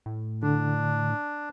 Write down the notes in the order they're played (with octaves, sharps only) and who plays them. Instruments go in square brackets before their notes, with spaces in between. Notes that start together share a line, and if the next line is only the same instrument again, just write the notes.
[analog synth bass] A2
[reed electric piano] D3 [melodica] D4